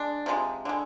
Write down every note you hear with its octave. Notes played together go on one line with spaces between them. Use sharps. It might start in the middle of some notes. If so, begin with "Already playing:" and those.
Already playing: G#3 D4
C3 F3 G#3
D3 G#3